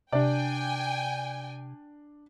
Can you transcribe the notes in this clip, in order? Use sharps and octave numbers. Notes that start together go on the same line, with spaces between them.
C3 D4 D5 G5 G#5